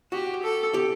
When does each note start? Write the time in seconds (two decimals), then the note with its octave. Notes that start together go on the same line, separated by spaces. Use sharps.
0.12 F#4 G4
0.43 A4
0.74 G4